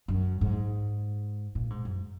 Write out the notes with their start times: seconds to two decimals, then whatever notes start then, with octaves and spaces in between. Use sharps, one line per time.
0.08 F#2
0.41 G#2
1.55 A#2
1.70 G#2
1.85 F#2